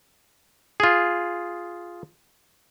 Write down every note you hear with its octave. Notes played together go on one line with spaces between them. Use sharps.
F4 G#4